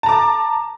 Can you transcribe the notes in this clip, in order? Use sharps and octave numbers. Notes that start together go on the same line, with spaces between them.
A5 A#5 D6